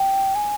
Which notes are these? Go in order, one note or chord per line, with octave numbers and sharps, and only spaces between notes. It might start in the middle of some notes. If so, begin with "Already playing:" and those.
Already playing: G5
G#5